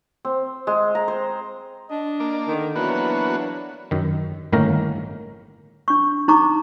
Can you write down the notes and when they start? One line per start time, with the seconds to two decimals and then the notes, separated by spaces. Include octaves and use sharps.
0.25 C4
0.67 G#3
0.95 A#5
1.08 C5
1.90 D4 D#5
2.20 A#3 D5
2.48 D3 D#3
2.76 E3 F#3 A#3 B3 D4 F#4
3.91 F#2 D#3
4.52 G1 A2 D#3 A#3 C#4 A#4
5.88 D4 C#6
6.28 D#4 A#5 C#6 D6